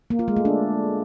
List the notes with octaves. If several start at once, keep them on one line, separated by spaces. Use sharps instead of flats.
A#3
F4
G#3
A3
D4